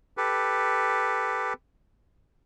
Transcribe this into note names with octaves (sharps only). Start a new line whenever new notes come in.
G4 A4 B4